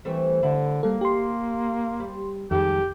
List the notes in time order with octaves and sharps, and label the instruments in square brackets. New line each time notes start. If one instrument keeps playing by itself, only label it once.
[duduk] E3 [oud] G3 A3 C4
[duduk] D3 [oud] E4
[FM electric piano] G3 A4 [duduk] A#3
[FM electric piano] G4 C6
[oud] G3
[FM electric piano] F2 D#3 [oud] G3 G#3 A4 [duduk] G4